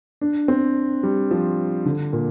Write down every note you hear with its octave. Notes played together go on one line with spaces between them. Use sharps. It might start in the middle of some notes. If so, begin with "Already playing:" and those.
D4
C4
G3
F3
D3
A#2